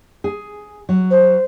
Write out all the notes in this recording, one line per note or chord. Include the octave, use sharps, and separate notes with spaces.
G#4
F#3
C5